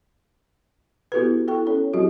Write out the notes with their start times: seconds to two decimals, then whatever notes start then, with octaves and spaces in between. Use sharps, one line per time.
1.12 B3 E4 F#4 G4 A4 B4
1.48 E4 A4 G5 C#6
1.67 C#4 A4 C#5
1.93 F#3 C4 E4 F#4 G4